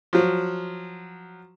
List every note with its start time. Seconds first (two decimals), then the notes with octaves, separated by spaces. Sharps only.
0.13 F3 F#3